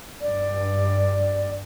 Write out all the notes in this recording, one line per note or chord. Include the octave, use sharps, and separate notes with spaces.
G2 D5